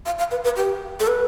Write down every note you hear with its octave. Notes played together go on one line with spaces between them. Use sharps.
F5
F5
B4
B4
G4
A4
B4